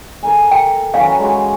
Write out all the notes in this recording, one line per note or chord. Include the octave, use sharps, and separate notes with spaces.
A4 A#4 G#5
G5
E3 F#3 C#4 F5
G#3 F#4